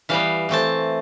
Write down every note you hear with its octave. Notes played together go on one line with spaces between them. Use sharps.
E3 G3 B3 F5
E3 A3 C4 A5